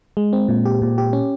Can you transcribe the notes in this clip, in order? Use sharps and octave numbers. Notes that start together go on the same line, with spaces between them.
G#3
C4
A#2
G4
A#2
G4
C#4